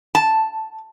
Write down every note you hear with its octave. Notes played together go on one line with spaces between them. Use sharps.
A5